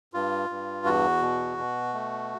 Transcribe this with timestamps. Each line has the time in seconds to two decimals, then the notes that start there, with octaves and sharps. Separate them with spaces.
0.14 G2 F4
0.50 G2
0.86 E2 F#4
1.21 B2
1.58 B2
1.94 A3